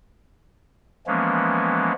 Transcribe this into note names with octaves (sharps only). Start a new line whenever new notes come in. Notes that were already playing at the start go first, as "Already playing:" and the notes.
E3 F3 G#3 A#3 B3 C#4